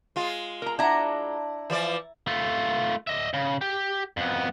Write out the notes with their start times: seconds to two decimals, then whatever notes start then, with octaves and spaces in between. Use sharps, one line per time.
0.16 G#3 F4
0.62 A#4 A#5
0.79 D4 E4 F#5 A#5
1.70 E3 F3 D5
2.27 A3 F4
3.07 D#5 E5
3.34 C#3
3.61 G4
4.17 F2 B3